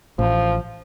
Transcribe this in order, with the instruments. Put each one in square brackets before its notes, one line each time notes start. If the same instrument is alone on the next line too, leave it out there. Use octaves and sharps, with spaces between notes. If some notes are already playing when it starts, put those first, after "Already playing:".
[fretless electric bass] A1 [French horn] F3